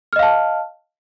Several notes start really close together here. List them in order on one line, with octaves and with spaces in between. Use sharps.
F6 D#5 F5 A5